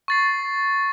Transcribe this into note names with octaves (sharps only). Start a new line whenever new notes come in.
C#6 A6 C7